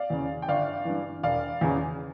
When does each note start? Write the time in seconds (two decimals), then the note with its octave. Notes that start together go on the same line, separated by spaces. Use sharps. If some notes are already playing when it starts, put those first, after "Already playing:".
Already playing: D5 F5
0.10 E2 C#3
0.42 G5
0.48 G1 D5 F5
0.85 G2 E3
1.23 E1 D5 F5
1.61 E2 C#3 E3